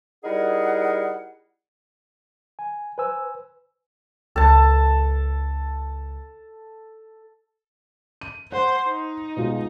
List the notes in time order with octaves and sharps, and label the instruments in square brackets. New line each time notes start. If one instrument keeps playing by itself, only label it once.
[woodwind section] G3 D#4 E4 G#4 A#4 F#5
[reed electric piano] G#5
B4 C5 G#5 E6
[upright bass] C#2 [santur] A4 A5
[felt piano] D#7
[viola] C5 [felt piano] F#5
[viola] D#4
[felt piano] B2 G#3 F4